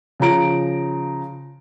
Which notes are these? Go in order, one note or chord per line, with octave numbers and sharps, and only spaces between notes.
C#3 F3 A#5 D7